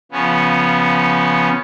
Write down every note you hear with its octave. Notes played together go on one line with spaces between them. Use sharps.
C#3 F3 B3 C#4